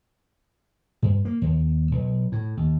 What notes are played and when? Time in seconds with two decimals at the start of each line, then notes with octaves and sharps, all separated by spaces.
1.02 G2
1.25 A#3
1.42 D#2
1.91 B1
2.32 A2
2.57 D#2